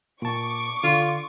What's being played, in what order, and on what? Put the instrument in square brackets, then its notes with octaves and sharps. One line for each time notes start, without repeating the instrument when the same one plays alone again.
[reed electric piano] A#2 A5 [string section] C#6 D6
[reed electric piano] D3 C6 [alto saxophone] F4